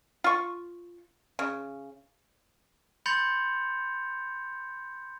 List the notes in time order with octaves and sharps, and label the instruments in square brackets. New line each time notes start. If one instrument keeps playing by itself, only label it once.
[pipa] F4 C#6
C#3
[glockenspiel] B5 C6 G6 A6 C#7 F7